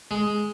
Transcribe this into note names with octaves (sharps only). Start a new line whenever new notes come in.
G#3